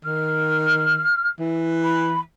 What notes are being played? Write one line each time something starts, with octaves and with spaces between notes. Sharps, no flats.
D#3 F6
E3
B5